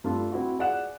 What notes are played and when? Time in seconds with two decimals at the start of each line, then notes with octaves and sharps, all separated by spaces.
0.04 G2 A3 D4 F4
0.32 C4 E4 F#4
0.59 G#4 D5 F#5 F#6 E7